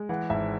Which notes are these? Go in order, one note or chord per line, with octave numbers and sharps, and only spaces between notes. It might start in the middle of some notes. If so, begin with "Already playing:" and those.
Already playing: G#3
E3 F#5
G#1 E5